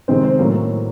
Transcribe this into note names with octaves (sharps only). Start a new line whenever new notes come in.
C3 D#3 G#3 C4 C5
C5
A2 F#3 A#3